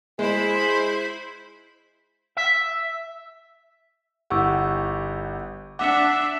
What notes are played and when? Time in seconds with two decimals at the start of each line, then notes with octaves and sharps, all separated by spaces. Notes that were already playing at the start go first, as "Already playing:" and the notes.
0.19 G#3 E4 G#4 C5 B5
2.37 E5
4.30 G1 E4 G4 F#5 C#6 E6
5.79 D4 E5 F#5 D6 C#7